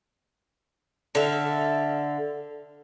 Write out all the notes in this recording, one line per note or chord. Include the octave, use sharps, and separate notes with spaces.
D3 E5 F5